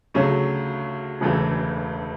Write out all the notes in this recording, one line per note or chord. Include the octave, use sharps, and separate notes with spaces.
D2 C#3 F#3 A3 C#4
E1 D2 C#3 E3 A3